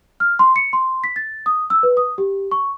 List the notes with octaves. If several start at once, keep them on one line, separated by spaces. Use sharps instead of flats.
F6
C6
C#7
C6
B6
A6
D#6
E6
B4
D#6
G4
C#6